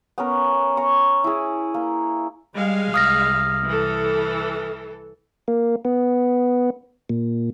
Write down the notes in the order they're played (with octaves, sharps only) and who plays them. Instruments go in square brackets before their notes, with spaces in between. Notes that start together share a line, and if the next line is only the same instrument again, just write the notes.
[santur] B3 C#4 A#4
G#5 A#5 C#6
E4 G#4
A#3
[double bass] G3 [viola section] G#3 F5
[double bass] C2 [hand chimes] D#6 F6 A#6
[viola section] E3 A4
[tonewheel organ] A#3
B3
A#2